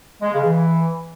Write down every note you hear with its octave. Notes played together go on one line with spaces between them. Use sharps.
G#3
C#3
E3